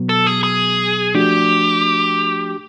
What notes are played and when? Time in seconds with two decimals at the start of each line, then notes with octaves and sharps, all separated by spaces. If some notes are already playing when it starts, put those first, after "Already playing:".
Already playing: B2 F#3 B3
0.09 A4
0.27 G#4
0.44 G#4
1.15 F3 A3 D4 F#4 G4